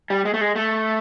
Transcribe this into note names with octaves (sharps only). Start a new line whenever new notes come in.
G3
G#3
A3
G#3
A3